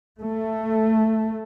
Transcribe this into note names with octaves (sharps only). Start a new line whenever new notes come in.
A3